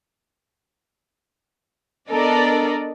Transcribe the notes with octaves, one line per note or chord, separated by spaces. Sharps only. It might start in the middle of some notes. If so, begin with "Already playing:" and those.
B3 D4 A4 A#4 D5 D#5